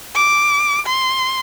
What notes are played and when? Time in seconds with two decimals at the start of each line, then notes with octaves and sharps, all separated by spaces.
0.15 D6
0.87 C6